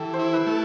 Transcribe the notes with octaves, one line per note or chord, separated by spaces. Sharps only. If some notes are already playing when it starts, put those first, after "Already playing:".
Already playing: E3 G4 A4
C5
E4
B4
A3